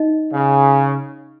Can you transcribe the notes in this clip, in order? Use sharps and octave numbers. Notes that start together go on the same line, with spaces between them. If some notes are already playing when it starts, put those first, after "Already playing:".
Already playing: D#4 D#5
C#3